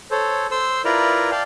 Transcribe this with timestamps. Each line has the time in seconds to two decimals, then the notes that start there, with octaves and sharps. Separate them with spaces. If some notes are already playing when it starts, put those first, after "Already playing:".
0.11 A4 C5 C#5
0.51 C5 C6 E6
0.85 E4 F4 A#4 B4 D5 A#5
1.31 D5 F5 G5 A5